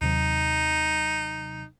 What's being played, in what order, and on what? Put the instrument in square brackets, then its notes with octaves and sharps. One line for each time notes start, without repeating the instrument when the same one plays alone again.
[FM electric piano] D#2 C3 F#3 [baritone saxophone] D#4